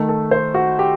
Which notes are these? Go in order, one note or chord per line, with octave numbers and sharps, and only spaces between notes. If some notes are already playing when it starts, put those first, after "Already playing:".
Already playing: D#3 A3
A4
C5
F#4
G4